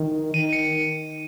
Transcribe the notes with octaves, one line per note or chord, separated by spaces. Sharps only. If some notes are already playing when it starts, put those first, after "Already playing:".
Already playing: D#3
D#3 D#7
C#7